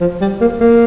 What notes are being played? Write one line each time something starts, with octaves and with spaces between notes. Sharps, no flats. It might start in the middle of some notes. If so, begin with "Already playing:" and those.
F3
G3
A#3
A#3